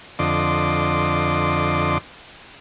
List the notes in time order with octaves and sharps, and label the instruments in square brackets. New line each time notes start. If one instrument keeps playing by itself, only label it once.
[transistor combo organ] F2 D3 D#5 C6 D6